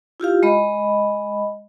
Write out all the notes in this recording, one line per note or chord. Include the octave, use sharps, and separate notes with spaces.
E4 F4 G4 F5
G#3 D#5 B5